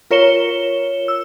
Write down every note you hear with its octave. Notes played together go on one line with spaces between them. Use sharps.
F4 A#4 C#5 C#7 E7 G7
E6